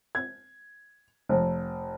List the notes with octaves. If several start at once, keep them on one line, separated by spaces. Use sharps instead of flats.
G#6
F1